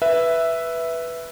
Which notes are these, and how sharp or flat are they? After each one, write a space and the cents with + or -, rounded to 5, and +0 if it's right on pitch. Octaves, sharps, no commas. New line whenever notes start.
B4 +0 E5 +0